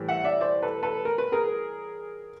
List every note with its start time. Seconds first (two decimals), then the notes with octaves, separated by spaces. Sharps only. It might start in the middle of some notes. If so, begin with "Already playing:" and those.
Already playing: A2 E3 G3
0.09 E5 F#5
0.24 D5 E5
0.41 C5 D5
0.63 A4 B4
0.83 A4 B4
1.05 A#4
1.18 B4
1.32 G#4 A#4